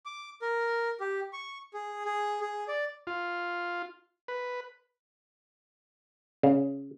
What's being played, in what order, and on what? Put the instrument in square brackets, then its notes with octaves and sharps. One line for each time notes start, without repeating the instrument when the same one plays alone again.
[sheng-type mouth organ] D6
A#4
G4
C#6
G#4
G#4
G#4
D5
[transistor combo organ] F4
B4
[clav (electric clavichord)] C#3